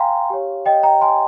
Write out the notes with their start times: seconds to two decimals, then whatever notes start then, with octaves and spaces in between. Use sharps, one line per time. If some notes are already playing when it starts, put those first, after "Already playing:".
Already playing: F5 G5 G#5 A#5 C6
0.30 G4 C#5
0.66 D#5 G5
0.83 G5 A#5
1.01 G#5 C6